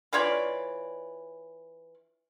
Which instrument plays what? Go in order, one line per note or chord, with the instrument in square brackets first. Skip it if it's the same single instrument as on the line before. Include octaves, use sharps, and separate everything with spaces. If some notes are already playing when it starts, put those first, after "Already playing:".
[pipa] E3 F4 C#5 D5